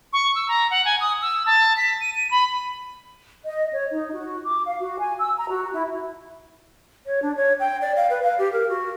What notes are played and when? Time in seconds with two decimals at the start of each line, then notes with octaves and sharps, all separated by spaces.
0.13 C#6
0.35 E6
0.48 A#5
0.71 F#5
0.85 G#5
1.01 D#6
1.22 E6
1.46 A5
1.77 B6
2.01 D#7
2.15 D#7
2.31 B5
3.44 D#5
3.73 C#5
3.91 D#4
4.13 F#4
4.44 D6
4.65 F5
4.80 F#4
4.98 G#5
5.18 E6
5.36 A#5
5.49 F#4
5.72 E4
7.06 C#5
7.22 D4
7.36 C#5
7.60 G5
7.81 D5
7.96 F5
8.10 B4
8.23 F5
8.39 G4
8.53 A#4
8.69 F#4